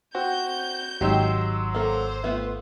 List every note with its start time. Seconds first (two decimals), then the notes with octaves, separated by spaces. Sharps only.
0.15 C4 F#4 G6
1.01 G#1 F#3 D#4 G4 C6 E6
1.75 A#3 A4 C5
2.24 A3 B3 F4